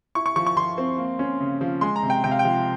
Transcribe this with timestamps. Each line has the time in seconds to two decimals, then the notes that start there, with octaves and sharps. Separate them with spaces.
0.15 E4 C#6
0.26 C#6
0.36 F3 C#6
0.47 C#6
0.56 F3 C6
0.78 C4
0.98 A#3
1.19 C#4
1.40 C#3
1.61 F3
1.81 G#3 C6
1.96 A#5
2.03 C3
2.10 G5
2.24 C3 G5
2.31 F5
2.39 G5
2.45 F3